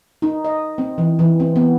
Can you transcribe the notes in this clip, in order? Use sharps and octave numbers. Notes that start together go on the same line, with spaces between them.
D#4
D#5
C4
E3
E3
C4
B3